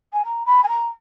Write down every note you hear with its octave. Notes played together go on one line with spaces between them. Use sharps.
G#5
A#5
B5
G#5
A#5